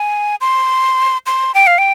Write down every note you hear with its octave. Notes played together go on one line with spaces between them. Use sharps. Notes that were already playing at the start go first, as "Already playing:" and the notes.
Already playing: G#5
C6
C6
G5
F5
G5